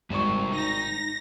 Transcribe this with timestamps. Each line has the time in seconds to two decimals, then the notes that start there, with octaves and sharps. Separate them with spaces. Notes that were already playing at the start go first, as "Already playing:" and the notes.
0.10 G#1 G3 C5 D5 C#6
0.52 D#4 A#6